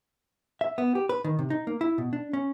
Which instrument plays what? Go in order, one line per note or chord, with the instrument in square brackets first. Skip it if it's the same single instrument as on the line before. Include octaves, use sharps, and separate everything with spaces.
[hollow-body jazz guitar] E5
B3
G4
B4
D#3
C3
D#4
A#3
E4
B2
D4
C#4